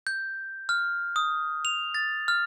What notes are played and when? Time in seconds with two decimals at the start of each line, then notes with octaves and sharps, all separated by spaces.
0.07 G6
0.69 F6
1.16 D#6
1.65 F7
1.94 A6
2.28 F6